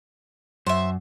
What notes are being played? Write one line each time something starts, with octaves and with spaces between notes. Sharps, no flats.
F#2 C5 E5